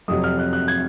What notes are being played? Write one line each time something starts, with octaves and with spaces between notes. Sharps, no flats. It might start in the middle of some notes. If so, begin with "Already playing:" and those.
F2 C3 F#3 D#6
F6
F#6
F#6
G#6